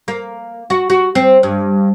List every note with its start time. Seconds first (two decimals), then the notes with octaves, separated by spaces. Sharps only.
0.08 A#3
0.70 F#4
0.90 F#4
1.15 C4
1.43 G2